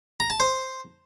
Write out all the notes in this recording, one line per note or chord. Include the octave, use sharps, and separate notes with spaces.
A#5
A5
C5